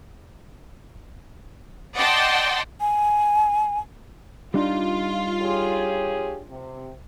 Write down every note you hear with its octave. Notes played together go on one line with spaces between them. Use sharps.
D5 D#5 F#5 G5 A5 C6
G#5
G3 D4 D#4 F4
G4 G#4 C#5
C3